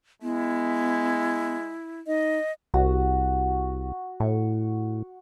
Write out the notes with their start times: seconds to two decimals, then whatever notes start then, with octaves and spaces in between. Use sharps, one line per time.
0.22 G#3 B3 E4
2.07 D#4 D#5
2.74 C2 F#4
4.20 A2 C#6